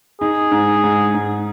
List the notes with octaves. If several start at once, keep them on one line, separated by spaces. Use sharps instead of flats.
D#4 G#4
G#2
G#2
G#2